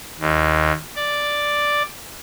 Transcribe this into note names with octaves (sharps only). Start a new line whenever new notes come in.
D#2
D5